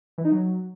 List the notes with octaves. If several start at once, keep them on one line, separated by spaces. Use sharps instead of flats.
E3
D#4
F#3